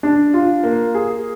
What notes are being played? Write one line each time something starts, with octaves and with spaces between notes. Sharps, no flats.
D4
F4
A#3
G#4